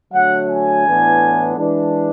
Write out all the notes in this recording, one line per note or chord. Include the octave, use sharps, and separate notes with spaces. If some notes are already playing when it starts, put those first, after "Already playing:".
D3 F#3 A3 F#5
G#5
A2 E3 B3 D4
E3 G#3 D4